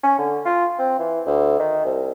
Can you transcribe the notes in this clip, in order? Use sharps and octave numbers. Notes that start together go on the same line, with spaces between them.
C#4
D3
F4
C4
E3
D2
D#3
C2